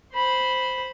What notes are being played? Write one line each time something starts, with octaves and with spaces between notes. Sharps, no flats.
C5 B5